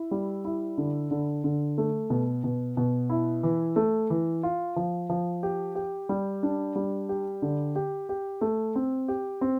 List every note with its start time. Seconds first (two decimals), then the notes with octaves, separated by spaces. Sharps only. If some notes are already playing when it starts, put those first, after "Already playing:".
Already playing: E4
0.11 G3
0.45 E4
0.78 D3
1.11 D3
1.44 D3
1.78 A3
2.10 B2
2.44 B2
2.77 B2
3.10 E4
3.43 E3
3.76 A3
4.10 E3
4.43 F4
4.76 F3
5.10 F3
5.43 G4
5.75 G4
6.09 G3
6.43 D4
6.76 G3
7.09 G4
7.42 D3
7.75 G4
8.09 G4
8.41 A3
8.75 C4
9.08 G4
9.41 C4